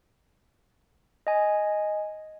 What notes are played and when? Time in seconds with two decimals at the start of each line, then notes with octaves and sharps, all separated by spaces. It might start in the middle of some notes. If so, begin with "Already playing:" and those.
1.27 D#5 G#5